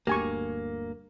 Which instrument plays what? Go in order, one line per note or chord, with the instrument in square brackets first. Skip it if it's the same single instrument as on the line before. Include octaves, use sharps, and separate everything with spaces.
[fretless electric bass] G1 D2 [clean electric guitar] A#3 [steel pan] G4 G#5 C#6